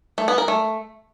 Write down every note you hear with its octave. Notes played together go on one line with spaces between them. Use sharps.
A3
B3
A#4
A3